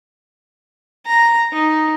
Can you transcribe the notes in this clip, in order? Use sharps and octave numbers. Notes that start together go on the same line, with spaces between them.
A#5
D#4